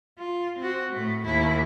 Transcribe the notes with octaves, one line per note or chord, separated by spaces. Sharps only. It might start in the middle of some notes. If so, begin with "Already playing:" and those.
F4
C4 F#4
A2 A3
D#2 E4